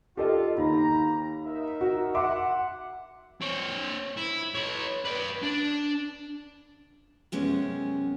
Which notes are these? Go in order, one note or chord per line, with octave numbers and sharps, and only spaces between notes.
F4 G4 A4 D#5
D#2 G4 A#5 B5
D#4 A#4 E5
F#4
E5 F#5 C6 D6
C4 C#5
E4
B4 C#5
B4 D5
D4
F#2 C3 G#3 B3 C#4